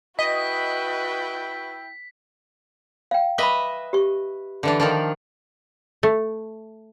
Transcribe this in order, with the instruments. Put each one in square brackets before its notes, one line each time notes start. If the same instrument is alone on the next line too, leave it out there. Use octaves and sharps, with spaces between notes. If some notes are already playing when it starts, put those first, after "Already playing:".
[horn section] E4 G5 [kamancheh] F#4 B4 [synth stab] D#5 [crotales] B6
[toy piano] F5 G5
[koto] B4 D#5 E5 [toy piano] B5 C#6 D6
[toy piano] G4 C#6
[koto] D3 E3 D4
D#3 F3 D4
A3